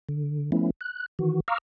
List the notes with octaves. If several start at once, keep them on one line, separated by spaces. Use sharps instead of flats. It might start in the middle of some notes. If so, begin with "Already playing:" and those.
D3
F3 A3 B3 C#4 E4
F#6
D#3 E3 F#4
F5 A#5 C#6 D6 E6 F6